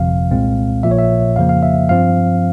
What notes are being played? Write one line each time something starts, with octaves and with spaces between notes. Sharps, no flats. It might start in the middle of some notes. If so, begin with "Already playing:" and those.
Already playing: G1 F2 C3 F3 F5
C2 A#2 G#3 C4
A#1 A#2 F3 E5
C#5
E5
F2 C#3 F3 A#3 F5
F5
E5
G2 F3 C4 F5